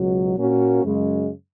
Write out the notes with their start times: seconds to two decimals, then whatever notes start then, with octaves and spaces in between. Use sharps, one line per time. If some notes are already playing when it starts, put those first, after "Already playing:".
Already playing: C#2 B2 F#3
0.37 A#2 A#3 C#4 F#4
0.84 F#2 C#3 G#3